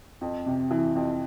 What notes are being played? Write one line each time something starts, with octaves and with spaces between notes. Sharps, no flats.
F2
C3
E3
F2